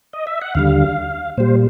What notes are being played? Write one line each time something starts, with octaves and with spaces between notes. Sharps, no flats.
D#5
E5
F#5
D#2 D3 G3 F5
A#2 G3 C5